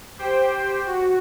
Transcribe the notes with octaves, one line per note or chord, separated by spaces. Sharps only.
G4 C5 G5
F#4